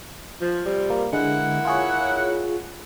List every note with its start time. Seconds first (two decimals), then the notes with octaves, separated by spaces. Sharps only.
0.40 F3
0.65 C3 F3 G3
0.90 A#3
1.13 D3 G#3 A#3 E4 F#5
1.65 F4 G#4 C#5